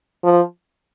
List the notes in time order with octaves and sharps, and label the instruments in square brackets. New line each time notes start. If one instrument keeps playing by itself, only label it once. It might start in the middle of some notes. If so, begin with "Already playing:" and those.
[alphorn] F3